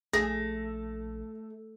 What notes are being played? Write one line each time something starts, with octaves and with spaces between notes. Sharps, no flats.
A#1 A3 G#4 A#6